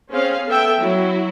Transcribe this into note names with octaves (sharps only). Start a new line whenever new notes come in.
C4 C#4 G#4 F5
B3 A4 E5 G5
F#3 E4